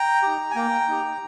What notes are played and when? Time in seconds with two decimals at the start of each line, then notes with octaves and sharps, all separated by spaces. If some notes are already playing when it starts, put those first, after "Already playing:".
Already playing: G5 A#5
0.23 D#4 G4
0.51 G#5
0.55 A#3 G5 A#5
0.89 D#4 G4